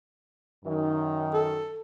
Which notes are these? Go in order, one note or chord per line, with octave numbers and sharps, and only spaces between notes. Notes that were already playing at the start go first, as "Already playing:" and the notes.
F#2 D#3
A4